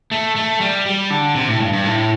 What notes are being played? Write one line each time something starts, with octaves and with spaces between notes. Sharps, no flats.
A3
A3
G3
G3
D3
C3
A2
G2
G2
A2